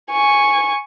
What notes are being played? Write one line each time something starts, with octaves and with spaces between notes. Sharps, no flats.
G#5 C#6